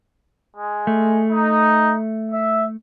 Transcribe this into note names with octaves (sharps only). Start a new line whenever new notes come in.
G#3
A3
D#4
E5